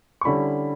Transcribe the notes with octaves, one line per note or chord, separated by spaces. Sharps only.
C#6
D3 G3 C#4 E4 B5